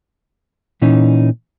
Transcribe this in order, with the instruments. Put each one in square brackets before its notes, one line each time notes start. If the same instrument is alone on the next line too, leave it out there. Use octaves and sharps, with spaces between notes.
[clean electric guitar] A#2 E3 C#4 D#4